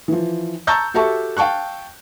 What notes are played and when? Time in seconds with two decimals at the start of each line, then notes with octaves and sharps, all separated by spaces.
0.08 E3 F3
0.67 A5 A#5 C#6 E6 G6 A6
0.94 F#4 G4 A4 E5 A5 C#6
1.37 F5 G5 A5 C#6 F#6